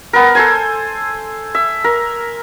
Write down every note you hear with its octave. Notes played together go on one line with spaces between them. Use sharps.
B3 A#4
A4 C5 G#5
E5
A#4